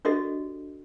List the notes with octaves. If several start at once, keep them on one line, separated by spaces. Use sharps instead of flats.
D4 F#4 G4 A4 D5 D#5